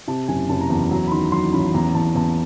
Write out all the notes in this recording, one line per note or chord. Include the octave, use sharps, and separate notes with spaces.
C3 A5
F#1 G#5
F#1 A5
A#5
E2 A5
F#3 A#5
B5
D#3 C6
F#3 C6
A1 B5
E2 A#5
E2 A5
E2 A5